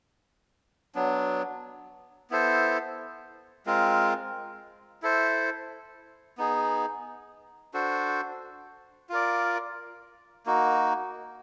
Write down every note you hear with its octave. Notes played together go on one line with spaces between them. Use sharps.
F#3 B3 D4
B3 E4 A4 C5
G#3 C4 F4 A#4
E4 A4 C5
B3 D#4 G#4
D4 F#4 A4 C5
F4 A#4 D5
A#3 D#4 F#4